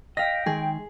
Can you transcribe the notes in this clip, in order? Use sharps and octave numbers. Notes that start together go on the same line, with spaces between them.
D#5 F5 G5 A#6 B6
D#3 G#3 G#4